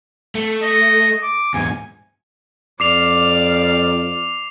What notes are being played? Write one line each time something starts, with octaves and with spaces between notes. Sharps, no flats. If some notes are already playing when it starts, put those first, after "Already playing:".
A3
D#5
D6
E2 G#2 G#5
F2 D5 F5 D6 C7 F7